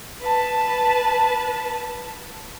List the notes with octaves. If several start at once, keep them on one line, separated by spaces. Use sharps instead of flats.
B4 A5